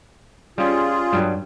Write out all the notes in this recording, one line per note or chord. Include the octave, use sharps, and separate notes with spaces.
G3 C#4 F4 G#4
G2 F#3 G3